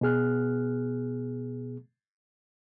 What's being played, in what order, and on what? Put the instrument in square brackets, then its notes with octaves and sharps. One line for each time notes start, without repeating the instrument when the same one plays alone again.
[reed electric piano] B2 B3 G#4 F6 F#6